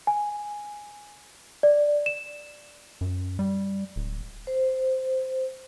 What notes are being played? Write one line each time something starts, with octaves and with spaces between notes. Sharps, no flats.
G#5
D5
E7
F#2
G3
D1
C5